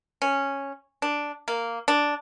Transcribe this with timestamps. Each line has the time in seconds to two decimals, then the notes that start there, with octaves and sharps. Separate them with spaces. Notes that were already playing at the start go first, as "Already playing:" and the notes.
0.22 C#4
1.02 D4
1.48 A#3
1.88 D4